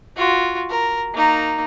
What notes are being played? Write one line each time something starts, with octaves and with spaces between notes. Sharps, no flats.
F4 F#4
A#4
A#3 D#4